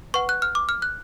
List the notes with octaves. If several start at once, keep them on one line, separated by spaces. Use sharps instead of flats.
B4 F#5 C#6
F#6
F6
D6
F6
F#6